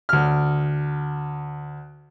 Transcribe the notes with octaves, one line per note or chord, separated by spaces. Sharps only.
D2 F6